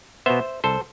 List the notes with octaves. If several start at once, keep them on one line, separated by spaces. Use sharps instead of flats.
B2 B3 C5 E5
C2 A4 C5